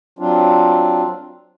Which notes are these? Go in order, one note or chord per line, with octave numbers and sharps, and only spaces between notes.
F#3 C4 D4 F4